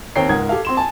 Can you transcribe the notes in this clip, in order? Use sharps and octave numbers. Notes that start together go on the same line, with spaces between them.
D#2 C4 C#5 G5 A#5 C7
C#2 G#2 A#4 F#5 D#6 G#6
G4 A4 F5
C4 C6 E7
G#5 A5